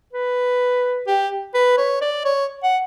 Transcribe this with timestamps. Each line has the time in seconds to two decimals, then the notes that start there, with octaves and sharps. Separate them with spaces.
0.13 B4
1.07 G4
1.54 B4
1.78 C#5
2.01 D5
2.24 C#5
2.63 F#5